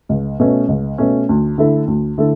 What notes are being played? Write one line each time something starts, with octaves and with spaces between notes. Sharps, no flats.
C#2
B2 A3 C#4
C#2
B2 A3 C#4
D2
D3 A3 E4 A4
D2
D3 A3 E4 A4